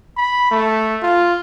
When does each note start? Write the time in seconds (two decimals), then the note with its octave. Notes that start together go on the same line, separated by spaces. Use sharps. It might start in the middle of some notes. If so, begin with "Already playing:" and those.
0.17 B5
0.51 A3
1.03 F4